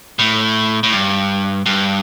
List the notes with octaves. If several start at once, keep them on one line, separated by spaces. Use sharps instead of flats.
A2
A2
G2
G2